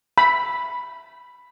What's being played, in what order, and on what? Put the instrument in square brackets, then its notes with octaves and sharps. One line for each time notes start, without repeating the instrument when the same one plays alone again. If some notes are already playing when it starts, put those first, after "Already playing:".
[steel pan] B5